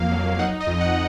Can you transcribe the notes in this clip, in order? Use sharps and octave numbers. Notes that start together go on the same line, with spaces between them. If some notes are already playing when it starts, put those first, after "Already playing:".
Already playing: F2 A#3 F5
F#3
D#4 F#5
D#5
F2
F#5